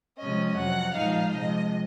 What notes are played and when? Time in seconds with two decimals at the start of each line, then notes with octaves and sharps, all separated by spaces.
0.19 C3 F3 G#3 C#4 D#5
0.56 F2 C3 F#3 F#5
0.94 A#2 F3 G#3 D#4 F5
1.33 C3 F3 G#3 D#5